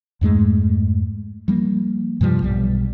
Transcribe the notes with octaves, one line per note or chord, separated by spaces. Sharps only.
F2 G#2 G#3 A3
F3 G3 A#3
G2 C3 F3 G3
B1 G3